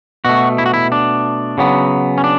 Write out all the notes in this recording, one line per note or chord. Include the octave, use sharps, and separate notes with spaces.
B2 A3 F#4
E4
F#4
E4
D4
C#3 F#3 B3
C#4
D4